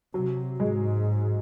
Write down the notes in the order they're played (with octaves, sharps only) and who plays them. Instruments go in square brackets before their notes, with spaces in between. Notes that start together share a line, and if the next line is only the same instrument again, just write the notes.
[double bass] C3 [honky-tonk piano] F#3
[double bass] G#2 [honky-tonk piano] G#3